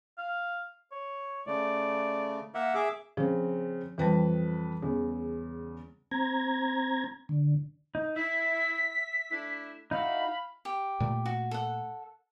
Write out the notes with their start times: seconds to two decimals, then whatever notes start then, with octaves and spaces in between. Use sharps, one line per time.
0.18 F5
0.92 C#5
1.47 C#3 A3 D5
2.54 A#3 E5 F#5
2.75 G#4 E5 D6
3.17 C#3 F3 C4
3.98 F2 E3 G3 B4 A5
4.82 E2 C#3
6.11 C4 A#5 G#6
7.29 D3
7.95 D#4
8.16 E4 E5 B6
9.31 A3 D4 E4
9.91 D#4 E4 F#4 F5 B5
10.65 G4
11.00 A#2 A3
11.26 F#4
11.51 A4 F#5